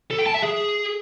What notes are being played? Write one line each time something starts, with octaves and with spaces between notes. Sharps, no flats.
A4
G5
A5
E5
G#4